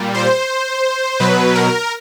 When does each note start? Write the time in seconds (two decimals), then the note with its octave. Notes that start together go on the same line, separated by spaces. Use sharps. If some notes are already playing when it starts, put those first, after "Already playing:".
Already playing: A#2 G3
0.14 C5
1.20 B2 F#3 B4
1.55 A#4